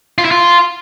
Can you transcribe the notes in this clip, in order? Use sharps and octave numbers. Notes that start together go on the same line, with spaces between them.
F4
E4
F4